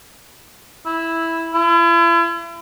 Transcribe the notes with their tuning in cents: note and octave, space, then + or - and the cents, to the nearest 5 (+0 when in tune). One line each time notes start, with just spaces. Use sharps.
E4 -5
E4 +40